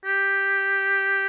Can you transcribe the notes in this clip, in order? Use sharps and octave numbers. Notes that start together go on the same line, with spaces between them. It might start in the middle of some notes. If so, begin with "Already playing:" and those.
G4